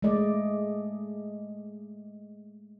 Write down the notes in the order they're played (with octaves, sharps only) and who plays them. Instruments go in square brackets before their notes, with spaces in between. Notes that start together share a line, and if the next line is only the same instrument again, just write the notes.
[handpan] G#3 A3 D5 D#5